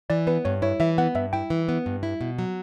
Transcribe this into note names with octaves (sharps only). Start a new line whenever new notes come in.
E3 D5
B3 B4
G2 C#5
E4 C#5
E3 E5
B3 F#5
G2 E5
E4 G5
E3
B3
G2
E4
B2
F#3